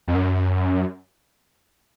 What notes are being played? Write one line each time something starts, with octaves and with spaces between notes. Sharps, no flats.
F2
F#2